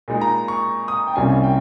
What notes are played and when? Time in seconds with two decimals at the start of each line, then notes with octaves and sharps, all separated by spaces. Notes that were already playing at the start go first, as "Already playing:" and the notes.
0.08 A#2 G#3 D#4
0.21 A#5
0.48 C#6
0.88 D#6
1.07 G5
1.16 C2 A#2 G3 C#4 G#5
1.43 G5